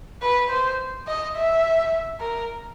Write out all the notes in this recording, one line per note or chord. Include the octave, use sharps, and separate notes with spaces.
B4
C5
D#5
E5
A#4